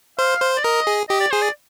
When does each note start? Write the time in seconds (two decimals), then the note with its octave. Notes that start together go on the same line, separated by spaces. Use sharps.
0.19 C5 F5
0.41 C5
0.57 D5
0.64 A#4 D#5
0.87 G#4
1.09 G4 D#5
1.20 D5
1.31 G#4 C5
1.42 D5